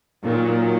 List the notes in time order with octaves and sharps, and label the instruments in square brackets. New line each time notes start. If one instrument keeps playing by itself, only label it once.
[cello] A#2 [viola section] D#3 F#3 C#4 F4